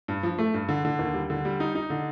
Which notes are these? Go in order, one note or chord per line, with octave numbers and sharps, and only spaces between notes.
G2
F3
A3
G2
D3
D3
D#2
G3
D3
G3
D#4
D#4
D3